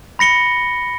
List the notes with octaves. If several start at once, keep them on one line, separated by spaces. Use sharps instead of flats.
B5 A#6 C#7 G7